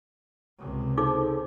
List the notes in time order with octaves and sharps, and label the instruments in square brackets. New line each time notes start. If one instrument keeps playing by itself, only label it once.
[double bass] C#2 C3
[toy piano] D#4 D6 [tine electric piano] G#4 A4 C5